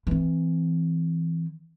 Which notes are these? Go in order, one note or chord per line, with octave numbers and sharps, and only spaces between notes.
E3 C4